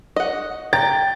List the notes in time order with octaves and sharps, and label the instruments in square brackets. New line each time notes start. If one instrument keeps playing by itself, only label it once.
[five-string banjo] D#5 F#5
[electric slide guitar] G5 [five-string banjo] A#5 [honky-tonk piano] A6